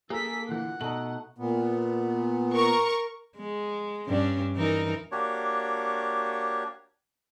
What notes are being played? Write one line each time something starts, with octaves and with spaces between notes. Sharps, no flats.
A#3 G#4 A4 A#5 E6 B6
A#2 D3 E3 F#5
B2 A3 D#4 F#7
A#2 B3
A#4 C#6
G#3
G2 C#4 D4
E3 D#4 A#4
A#3 D4 F#4 G4 C#5